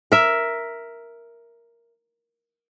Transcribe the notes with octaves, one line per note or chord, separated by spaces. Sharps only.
A#4 E5